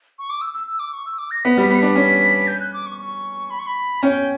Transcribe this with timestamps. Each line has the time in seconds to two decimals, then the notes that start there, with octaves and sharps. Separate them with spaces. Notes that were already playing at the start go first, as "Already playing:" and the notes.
0.19 C#6
0.30 D6
0.41 E6
0.54 E6
0.67 E6
0.79 D6
0.93 C#6
1.06 E6
1.19 D6
1.31 A#6
1.44 B3 B6
1.57 G3 B6
1.70 B3 C#7
1.79 D4 B6
1.95 C#4
2.47 G6
2.60 F#6
2.74 D6
2.86 C#6
2.99 C#6
3.50 B5
3.59 C#6
3.67 B5
4.03 C#4 G5